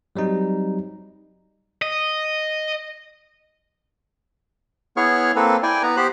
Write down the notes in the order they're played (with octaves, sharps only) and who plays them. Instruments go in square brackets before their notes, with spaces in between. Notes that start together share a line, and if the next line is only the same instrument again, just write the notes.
[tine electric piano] F#3 G3 C4 D#4
[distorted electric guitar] D#5
[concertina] B3 E4 G#4 C#5 C#6 F6
A#3 C4 A4 B4
E4 D5 G5 G#5
B3 B4 A#5
B3 G4 C5 B5 F#6